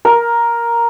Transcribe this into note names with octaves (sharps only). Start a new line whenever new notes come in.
A#4